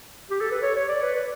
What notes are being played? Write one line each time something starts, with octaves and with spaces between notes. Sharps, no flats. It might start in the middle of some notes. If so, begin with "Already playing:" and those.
G4
A4
B4
C#5
C#5
D5
B4
B4